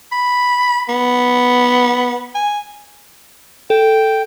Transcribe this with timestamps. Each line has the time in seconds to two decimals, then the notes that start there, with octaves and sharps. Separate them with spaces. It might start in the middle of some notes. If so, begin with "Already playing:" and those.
0.12 B5
0.89 B3
2.35 G#5
3.70 A4 G5